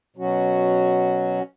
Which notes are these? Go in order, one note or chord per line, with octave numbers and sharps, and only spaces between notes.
B2 F#3 C#4 F#4